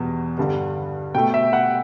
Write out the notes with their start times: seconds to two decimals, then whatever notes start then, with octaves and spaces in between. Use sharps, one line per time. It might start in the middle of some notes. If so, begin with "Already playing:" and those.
Already playing: E2 B2 G3
0.38 G2 D3 G3
1.15 B2 A3 G5
1.34 E5
1.53 F#5